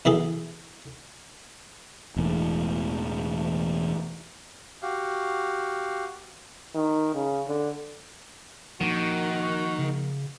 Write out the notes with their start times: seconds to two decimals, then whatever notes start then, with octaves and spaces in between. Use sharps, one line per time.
0.05 B2 E3 G#4 A4
2.16 E1 E2 A2
4.83 F#4 G4 F5
6.75 D#3
7.15 C#3
7.48 D3
8.81 D#3 F3 A#3 F#4
9.79 C#3